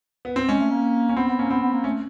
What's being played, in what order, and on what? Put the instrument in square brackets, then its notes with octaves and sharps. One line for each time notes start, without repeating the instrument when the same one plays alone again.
[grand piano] B3
C4
[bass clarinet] G#3 [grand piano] C#4
[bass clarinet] A3
A#3
[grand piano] C#4
[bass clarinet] B3 [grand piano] C4
[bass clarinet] B3
[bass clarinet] A#3 [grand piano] C#4
[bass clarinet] B3 [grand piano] C4
[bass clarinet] B3
A#3
[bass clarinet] A3 [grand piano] C#4